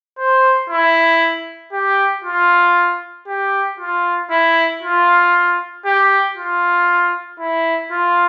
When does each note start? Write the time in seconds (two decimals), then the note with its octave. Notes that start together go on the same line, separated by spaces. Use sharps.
0.18 C5
0.70 E4
1.72 G4
2.24 F4
3.27 G4
3.79 F4
4.31 E4
4.82 F4
5.86 G4
6.37 F4
7.40 E4
7.92 F4